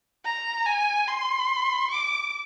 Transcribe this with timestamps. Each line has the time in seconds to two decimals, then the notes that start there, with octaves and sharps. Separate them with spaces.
0.24 A#5
0.66 G#5
1.07 C6
1.90 D6